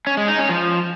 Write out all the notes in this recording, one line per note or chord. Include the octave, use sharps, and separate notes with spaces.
C#4
G#3
D#4
C#4
F3